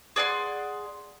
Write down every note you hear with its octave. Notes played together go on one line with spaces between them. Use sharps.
G#4 D5 F#5 C6